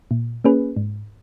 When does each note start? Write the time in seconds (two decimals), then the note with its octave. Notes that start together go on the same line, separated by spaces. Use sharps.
0.11 A#2
0.44 A#3 C#4 G#4 B4
0.76 G#2